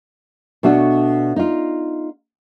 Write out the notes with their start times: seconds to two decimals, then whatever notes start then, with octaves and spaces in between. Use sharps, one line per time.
0.63 B2 A3 D4 F#4
1.36 D#4 F4